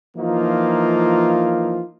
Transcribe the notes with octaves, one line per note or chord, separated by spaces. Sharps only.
E3 F3 A#3 D#4 F4